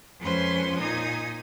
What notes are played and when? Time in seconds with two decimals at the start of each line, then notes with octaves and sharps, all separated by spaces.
0.19 F2 G#3 C#4 B4 C5 C6
0.78 A#2 D#4 G#5 D#6